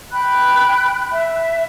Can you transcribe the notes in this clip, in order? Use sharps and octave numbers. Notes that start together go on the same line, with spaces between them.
G5 B5 F#6
E5